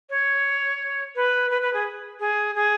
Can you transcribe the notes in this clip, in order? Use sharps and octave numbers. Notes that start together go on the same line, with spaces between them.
C#5
B4
B4
B4
G#4
G#4
G#4